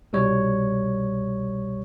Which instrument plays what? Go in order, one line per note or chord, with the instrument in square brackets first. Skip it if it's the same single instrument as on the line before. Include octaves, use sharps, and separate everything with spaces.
[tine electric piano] C2 B2 G3 C#5